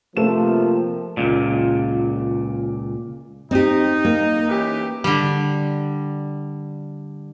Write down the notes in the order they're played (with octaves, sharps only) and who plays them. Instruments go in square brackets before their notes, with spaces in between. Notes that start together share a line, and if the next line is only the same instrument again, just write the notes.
[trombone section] C3 F3 [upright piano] A3 B4 E7 [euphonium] A#3
[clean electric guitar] C#2 A#2
[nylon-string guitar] C4 G4 [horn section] D#4
[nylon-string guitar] A#3
[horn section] E3 C#4 G4
[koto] D3 G3